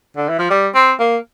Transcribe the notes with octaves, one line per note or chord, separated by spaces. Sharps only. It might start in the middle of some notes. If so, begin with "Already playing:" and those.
D3
E3
F3
G3
C4
A#3